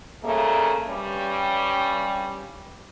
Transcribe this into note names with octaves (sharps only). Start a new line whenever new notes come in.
C#3 G3 A3 A#3
G2 G3 C#4